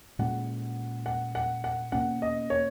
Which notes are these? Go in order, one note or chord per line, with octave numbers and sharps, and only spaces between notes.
A#2 G#3 C#4 F#5
F#5
F#5
F#5
B2 A#3 C#4 F#5
D#5
C#5